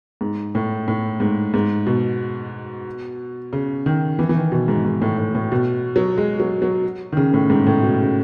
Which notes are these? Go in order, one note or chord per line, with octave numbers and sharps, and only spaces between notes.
G#2
A2
A2
G#2
G#2
B2
C#3
D#3
E3
E3
D#3
B2
G#2
G#2
A2
A2
A2
B2
F#3
G#3
F#3
F#3
D#3
C#3
A2
G#2
A2
B2
C#3